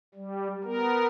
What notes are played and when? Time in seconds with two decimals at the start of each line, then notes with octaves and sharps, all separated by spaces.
0.15 G3
0.64 B3 A#4